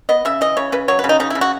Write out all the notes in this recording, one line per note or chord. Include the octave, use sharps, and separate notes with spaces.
B3 D#5
C#3 E5
E3 D#5
C#3 C#5
C#3 B4
F#3 C#5
B4
C#3
D#4
C#3 D#4
E4
C#3
F#4